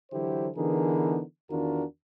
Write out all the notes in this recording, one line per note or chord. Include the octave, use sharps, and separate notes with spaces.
D3 E3 F#3 E4 G4 C5
D3 E3 B3 D#4 G#4 A#4
E2 D#3 D4 F4 F#4 A#4